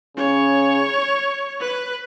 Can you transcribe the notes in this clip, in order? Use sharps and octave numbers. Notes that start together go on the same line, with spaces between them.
C#3 C#5
B4